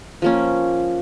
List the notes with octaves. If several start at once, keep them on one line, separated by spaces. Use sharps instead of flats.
F3 A#3 C#4